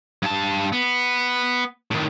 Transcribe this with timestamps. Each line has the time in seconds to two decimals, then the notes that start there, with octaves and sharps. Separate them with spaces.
0.22 G2 A5
0.72 B3
1.91 A2 D#3